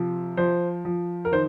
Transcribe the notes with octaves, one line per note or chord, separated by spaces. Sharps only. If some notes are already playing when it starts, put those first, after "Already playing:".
Already playing: C3 F3
F3 C5
F3
A#4
D#3 C5